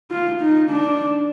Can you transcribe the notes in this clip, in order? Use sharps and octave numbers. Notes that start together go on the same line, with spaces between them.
F4
D#4
D4